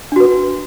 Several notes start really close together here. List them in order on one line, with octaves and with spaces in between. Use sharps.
D4 F#4 B4